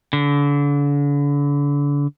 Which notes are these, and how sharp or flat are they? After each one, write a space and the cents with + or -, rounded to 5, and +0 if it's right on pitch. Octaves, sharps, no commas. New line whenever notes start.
D3 -35